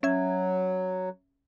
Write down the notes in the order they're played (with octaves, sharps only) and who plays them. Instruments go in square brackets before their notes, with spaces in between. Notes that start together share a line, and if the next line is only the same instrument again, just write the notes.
[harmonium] F#3 [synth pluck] C#4 E5 G#6